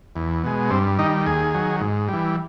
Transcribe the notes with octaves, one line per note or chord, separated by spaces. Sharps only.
E2
B2 G#3
G2 C4
D#3 G3 D#4
D#2 G#4
D#3 F#3
G#2
E3 G3